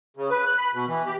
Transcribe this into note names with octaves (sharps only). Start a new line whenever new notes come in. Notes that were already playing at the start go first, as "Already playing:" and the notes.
C#3
B4
F#6
B5
B2
E3
G4